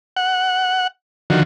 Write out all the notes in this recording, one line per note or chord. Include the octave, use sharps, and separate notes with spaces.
F#5
D3 D#3 F3 F#4